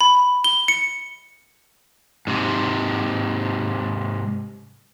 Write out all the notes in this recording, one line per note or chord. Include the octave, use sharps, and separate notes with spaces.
B5
G7
C#7
G#2 C3